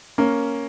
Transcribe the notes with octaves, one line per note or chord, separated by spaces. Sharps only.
A#3 C#4